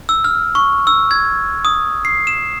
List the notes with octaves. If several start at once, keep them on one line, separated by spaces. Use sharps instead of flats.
E6
F6
C#6
E6
G#6
D#6
C7
E7